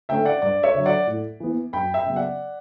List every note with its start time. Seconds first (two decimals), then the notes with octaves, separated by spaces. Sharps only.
0.09 D3 A3 C#4 E5 G5
0.25 D5 F#5
0.42 G2 D5
0.63 C#5 E5
0.75 D3 F#3
0.86 D5 F#5
1.07 A2
1.40 E3 B3
1.73 F#2 G5 B5
1.94 E5 G5
2.06 C#3 F#3 B3
2.16 D5 F#5